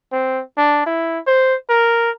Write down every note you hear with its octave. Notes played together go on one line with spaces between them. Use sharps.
C4
D4
E4
C5
A#4